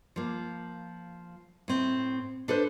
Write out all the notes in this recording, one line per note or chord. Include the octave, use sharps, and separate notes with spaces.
F3 A#3
A2 C4
D4 A4 B4 C5